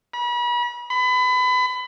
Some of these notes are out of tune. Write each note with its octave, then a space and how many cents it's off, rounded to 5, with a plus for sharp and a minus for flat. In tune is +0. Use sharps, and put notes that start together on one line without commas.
B5 -40
B5 +25